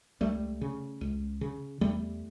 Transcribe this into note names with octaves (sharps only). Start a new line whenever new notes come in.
C#2 G3 A3
C#3
C#2
C#3
E2 G3 A3